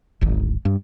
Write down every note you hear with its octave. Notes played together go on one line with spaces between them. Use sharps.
D1 G#1
G2